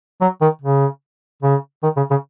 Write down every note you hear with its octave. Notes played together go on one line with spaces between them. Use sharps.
F#3
D#3
C#3
C#3
D#3
C#3
C#3